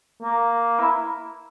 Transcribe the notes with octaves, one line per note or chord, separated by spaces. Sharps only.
A#3
E4